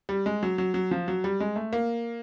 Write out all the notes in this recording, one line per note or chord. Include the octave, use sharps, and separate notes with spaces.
G3
G#3
F#3
F#3
F#3
F3
F#3
G3
G#3
A3
A#3